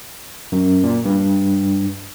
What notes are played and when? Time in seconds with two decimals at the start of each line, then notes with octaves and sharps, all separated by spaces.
0.52 F#2
0.83 A#2
1.05 G2